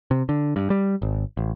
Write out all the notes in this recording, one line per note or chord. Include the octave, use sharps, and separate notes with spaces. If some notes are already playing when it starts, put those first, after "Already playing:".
C3
D3
G2
G3
G#1
A1